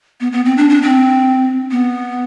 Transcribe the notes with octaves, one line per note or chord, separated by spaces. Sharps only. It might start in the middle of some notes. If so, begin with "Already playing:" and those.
B3
B3
C4
D4
D4
C4
B3